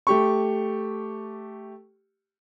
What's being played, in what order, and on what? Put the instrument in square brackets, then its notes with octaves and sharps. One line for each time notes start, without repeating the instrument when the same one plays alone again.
[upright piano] A3 G4 C#6